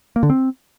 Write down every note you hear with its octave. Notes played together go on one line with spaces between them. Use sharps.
A#3
D3
C4